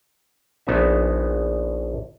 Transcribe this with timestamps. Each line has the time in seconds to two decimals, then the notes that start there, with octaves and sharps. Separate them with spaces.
0.67 A#1 B3 D#4 E5